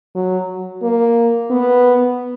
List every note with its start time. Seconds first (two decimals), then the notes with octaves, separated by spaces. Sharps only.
0.15 F#3
0.83 A#3
1.50 B3